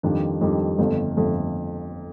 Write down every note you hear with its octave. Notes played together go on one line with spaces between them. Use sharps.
F2 D#3 G3 D4
F2 D#3 G3 D4
G1 F2 D3 A3
G1 F2 D3 A3